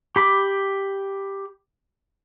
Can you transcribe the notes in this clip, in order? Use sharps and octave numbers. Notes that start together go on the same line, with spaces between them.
G4 B5 D6